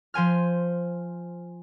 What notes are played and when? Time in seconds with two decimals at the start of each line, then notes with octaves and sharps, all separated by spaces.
0.14 F3 C5 G#5 F6